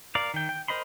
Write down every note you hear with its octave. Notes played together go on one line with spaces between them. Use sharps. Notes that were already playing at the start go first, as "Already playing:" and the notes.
A#4 D5 F5
D#3 G5
G5
A#4 C5 D#5 B5 C6